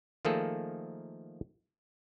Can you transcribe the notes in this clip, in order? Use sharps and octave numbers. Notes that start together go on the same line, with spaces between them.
D#3 F3 A3 A#3 G#4 A4